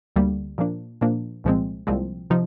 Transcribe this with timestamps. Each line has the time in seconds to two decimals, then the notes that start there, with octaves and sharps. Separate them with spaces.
0.16 D2 D3 G3 A#3
0.58 A#2 F3 A#3 D4
1.01 A#2 F3 A#3 D4
1.44 C2 A#2 F3 G#3 C4
1.87 C2 A#2 F3 G#3 C4
2.30 C3 F3 D#4